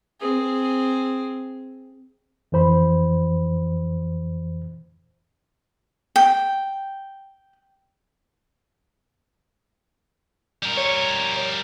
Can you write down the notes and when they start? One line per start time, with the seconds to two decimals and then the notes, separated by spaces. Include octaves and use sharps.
0.20 C4 G#4
2.52 F2 E3 C5 B5
6.16 G5
10.63 G3 A#4
10.77 C#5